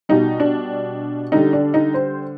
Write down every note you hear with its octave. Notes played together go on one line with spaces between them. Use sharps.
B2 G3 D#4
D4
D3 G3 D#4
D4
D#4
C5